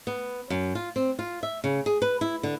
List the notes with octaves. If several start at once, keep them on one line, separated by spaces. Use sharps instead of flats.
B3
F#2
F4
C4
F4
E5
C#3
G#4
B4
E4
D3